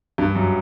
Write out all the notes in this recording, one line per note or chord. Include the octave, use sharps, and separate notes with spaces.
G2
F#2